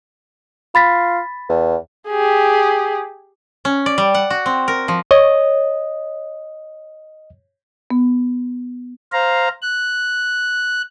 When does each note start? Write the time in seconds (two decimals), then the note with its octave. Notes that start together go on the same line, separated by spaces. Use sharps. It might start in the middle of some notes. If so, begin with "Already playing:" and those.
0.75 F4 B5 A6 B6
1.49 E2
2.09 G4 G#4
3.65 C#4
3.86 D5
3.98 G3
4.15 F#5
4.30 F#4
4.46 C4
4.68 A#4
4.88 F3
5.11 C#5 D#5
7.91 B3
9.12 C5 F5 A#5
9.62 F#6